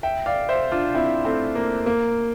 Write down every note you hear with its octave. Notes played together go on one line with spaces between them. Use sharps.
E5 G5
D5 F5
C5 E5
D4 F4
C4 E4
A3 C4
A#3
A#3